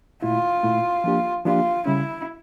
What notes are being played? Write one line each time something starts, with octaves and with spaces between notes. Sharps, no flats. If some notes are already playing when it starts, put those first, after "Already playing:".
A#2 A3 E4 F4
A#2 A3 E4
F3 A#3 D4 G4
F3 A#3 D4 F4 G4
C#3 G3 C#4 E4